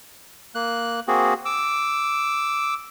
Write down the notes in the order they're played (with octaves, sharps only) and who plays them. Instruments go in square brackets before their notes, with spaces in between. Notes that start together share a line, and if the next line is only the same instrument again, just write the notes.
[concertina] A#3 F#6
A#3 C4 F#4 G#4
D6 E6